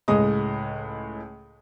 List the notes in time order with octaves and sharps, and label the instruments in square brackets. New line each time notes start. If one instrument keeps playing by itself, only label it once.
[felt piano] C#2 A2 G#3 D#5 D#6